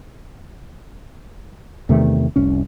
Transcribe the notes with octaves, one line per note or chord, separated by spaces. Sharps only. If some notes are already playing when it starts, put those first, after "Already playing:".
E2 C3 D#3 A3
F1 C2 C#4